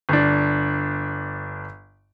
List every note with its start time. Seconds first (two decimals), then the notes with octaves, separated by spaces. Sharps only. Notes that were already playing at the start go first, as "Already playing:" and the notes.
0.09 G1 D4